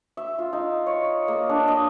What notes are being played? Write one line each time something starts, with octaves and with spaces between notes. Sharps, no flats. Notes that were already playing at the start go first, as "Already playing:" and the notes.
E5
F4
D#4
C#5
A#3
D4
D#5